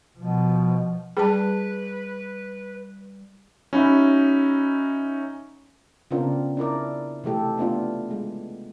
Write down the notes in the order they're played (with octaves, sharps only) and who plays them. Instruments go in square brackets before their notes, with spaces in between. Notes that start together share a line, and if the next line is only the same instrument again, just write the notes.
[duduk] B2 [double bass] F3
[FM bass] G3 [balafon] G#4 A5 [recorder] B4
[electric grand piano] C#4 D#4 F#4 E5 B5
[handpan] C#3 B3 C4 D4 F4 A#4
D4 E4 A#4 D5
C3 E3 A3 G4 A4
A3 B3 D4 F4
G#3